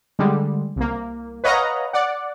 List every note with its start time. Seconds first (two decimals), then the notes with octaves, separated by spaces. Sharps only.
0.19 D3 G3 G#3
0.76 C2 A#3
1.44 B4 C#5 D#5 F5 F#5 A#5
1.93 D5 F#5